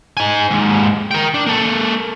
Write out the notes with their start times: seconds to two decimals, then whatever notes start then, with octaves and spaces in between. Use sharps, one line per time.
0.17 D#4 G#5
0.50 D#2 G#2
1.11 A#4 G5
1.34 D4
1.47 A#3 A4